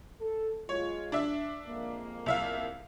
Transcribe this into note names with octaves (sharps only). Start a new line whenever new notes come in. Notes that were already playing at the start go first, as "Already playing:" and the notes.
A4
G#3 F4 C#5
D4 E5
F2 G#3 A#3
C2 E5 F5